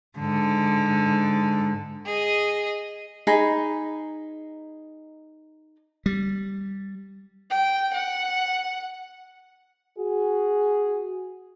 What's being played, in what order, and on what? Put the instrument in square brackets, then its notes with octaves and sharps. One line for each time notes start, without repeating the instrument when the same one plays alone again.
[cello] G#2 D3
[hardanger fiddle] G#4 D#5
[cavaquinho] D#4 G#4 G#5 B5
[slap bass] G3
[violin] G5
F#5
[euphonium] F#4 [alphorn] G#4